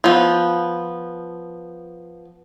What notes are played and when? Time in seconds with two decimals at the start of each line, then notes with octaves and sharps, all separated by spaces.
0.04 F3 B3